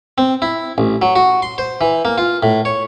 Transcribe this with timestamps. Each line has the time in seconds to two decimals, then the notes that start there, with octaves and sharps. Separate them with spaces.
0.18 C4
0.42 E4
0.78 A1
1.02 F#3
1.16 F#4
1.42 C6
1.58 C5
1.81 E3
2.05 A#3
2.18 F4
2.43 A2
2.65 C#5